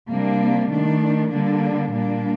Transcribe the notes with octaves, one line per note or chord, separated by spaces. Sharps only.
C3 G3 A#3 D4
D#3 A3 D4
D3 G3 A#3 D4
A#2 G3 A#3 D4